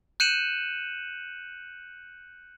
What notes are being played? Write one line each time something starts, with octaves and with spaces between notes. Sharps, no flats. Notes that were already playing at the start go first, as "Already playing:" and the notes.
F#6 G6 C#7 D#7 E7 F#7